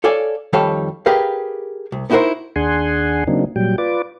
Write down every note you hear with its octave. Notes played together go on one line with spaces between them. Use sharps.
A4 C#5 D5 F5 G#5
F2 D#3 G3 A4 C#5 F5
G4 G#4 A#4 B4 F5
C2
B3 D#4 E4 F#4 A#4 C5
D#2 D4 G#4 F#5 G#5 C6
C#3 F#3 A#3 C4 D4 D#4
A#2 F#3 G3 G5
F4 B4 D5 D6